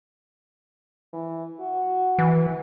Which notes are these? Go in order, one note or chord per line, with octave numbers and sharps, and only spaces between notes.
E3
F#4
E3